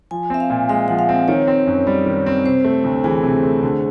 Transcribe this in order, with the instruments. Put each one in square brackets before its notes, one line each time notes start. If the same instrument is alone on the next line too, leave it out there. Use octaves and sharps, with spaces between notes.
[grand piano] F3 [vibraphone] G#5
[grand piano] C4 [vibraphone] E5
[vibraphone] F5
[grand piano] A#2
[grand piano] G#3 [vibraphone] E5
[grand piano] F3 [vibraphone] F#5
[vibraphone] F5
[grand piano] C4
[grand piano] D#3 [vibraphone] C#5
[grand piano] C4
F#2
G3
D#3
C4
[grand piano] C3 [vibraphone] C5
[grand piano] A3
D2
[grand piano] E3 [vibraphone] G#4
[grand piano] C3
A3
D3